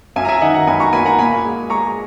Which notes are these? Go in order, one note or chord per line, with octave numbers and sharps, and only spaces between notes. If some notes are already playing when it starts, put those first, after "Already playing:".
F#2 E5 G#5
A#5
E5 G#5
D#3 D#5 F#5
F#5 A#5
F#2 G#5 B5
A#5 C#6
A#3 G#5 B5
F#5 A#5
A#2 G#5 B5
G#3
G#3 A#5 C#6